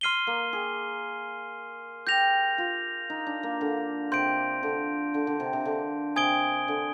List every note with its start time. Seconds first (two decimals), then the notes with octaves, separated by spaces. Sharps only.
0.01 C6 F6 C7 D#7 G7
0.27 A#3
0.53 G#4
2.07 G4 G6 A#6 F7
2.58 F4
3.10 D#4
3.27 D4
3.43 A#3
3.61 D3
4.12 C3 C6 G6 D7
4.63 D3
5.14 D3
5.27 D3
5.40 C3
5.53 C3
5.65 D3
6.16 C3 G#5 D#6 G#6 D7 G7
6.68 D3